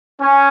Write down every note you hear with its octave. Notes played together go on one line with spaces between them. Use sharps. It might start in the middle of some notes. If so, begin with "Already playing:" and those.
C#4